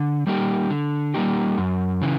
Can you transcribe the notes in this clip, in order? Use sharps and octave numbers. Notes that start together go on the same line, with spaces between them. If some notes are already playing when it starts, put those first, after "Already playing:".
Already playing: D3
G3 A#3 D#4 G4
D3
G3 A#3 D#4 G4
F#2
C#3 E3